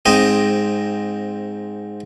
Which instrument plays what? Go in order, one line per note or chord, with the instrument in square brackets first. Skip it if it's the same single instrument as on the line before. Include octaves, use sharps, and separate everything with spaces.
[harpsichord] G#2 C4 D#5